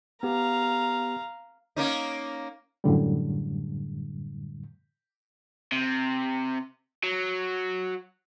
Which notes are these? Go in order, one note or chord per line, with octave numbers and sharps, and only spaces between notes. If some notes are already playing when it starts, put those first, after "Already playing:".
B3 G4 F5 A#5
A#3 C#4 D#4
F#2 A2 D3 G3
C3
F#3